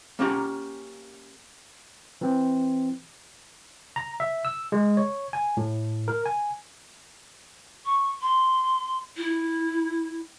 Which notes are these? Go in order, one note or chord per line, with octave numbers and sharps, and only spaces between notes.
A#3 C#4 G4 A#5
E3 C4
A#5
E5
E6
G#3
C#5
G#5
A2
A#4
G#5
C#6
C6
E4